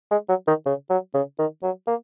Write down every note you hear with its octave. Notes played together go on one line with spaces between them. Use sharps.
G#3
F#3
D#3
C#3
F#3
C#3
D#3
F#3
A#3